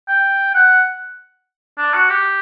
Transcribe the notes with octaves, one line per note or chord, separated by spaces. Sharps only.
G5
F#5
D4
F#4
G4